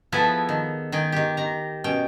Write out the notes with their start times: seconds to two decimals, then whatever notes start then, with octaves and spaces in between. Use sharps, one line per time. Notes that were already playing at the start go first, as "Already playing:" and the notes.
0.12 F3 B3 E4 G#4 A4
0.49 D#3
0.92 D#3 G#4 G5
1.12 D#3 G4
1.37 D#3 A#5
1.84 B2 C#4 G5